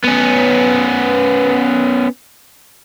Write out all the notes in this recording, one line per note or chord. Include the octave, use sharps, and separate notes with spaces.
B3 C#4